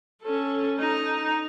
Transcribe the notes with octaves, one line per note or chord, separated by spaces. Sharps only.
C#4 A4
D#4